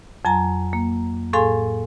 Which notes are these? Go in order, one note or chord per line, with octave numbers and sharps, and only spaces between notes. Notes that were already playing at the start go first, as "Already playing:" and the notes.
F2 F#3 G#5 A#5
A#3
A2 G#4 A4 F5 G#5 C6